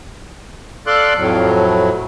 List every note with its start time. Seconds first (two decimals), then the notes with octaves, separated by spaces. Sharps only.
0.87 A4 D5 F5 C6 D6 F#6
1.17 F2 A2 F#3